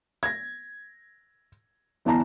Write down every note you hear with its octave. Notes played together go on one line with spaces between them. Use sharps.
G#6 A#6
G1 E2 E3 A5 A#5